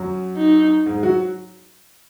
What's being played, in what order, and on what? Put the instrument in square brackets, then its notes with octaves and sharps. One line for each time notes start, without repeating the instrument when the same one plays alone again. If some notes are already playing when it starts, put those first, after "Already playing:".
Already playing: [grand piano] F#2 F#3
[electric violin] D#4
[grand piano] G#2 G#3
F#3 F#4